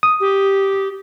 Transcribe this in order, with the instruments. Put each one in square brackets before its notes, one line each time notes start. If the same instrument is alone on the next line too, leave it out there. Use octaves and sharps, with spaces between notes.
[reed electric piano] D#6
[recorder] G4